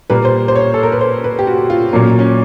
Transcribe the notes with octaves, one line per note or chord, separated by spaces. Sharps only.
A#2 G3 A#3 B4
C5
C5
C#5
A4
A#4
B4
C5
B4
G4
F#4
F4
A#2 F#3 A#3 C#4
C#4